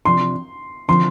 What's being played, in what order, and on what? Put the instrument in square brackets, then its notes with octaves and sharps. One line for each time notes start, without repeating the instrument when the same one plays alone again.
[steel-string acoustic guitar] C3 F3 D4 [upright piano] C6
[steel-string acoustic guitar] D3 F3 C4 [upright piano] C6